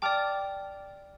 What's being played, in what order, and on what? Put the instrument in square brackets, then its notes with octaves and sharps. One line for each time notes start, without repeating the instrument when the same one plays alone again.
[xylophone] D5 G5 [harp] A5 D6 F6